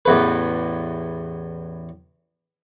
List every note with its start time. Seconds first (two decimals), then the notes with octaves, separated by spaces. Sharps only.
0.05 A1 E2 B4